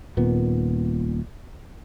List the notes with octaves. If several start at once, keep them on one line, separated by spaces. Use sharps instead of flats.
D#1 A#2 B3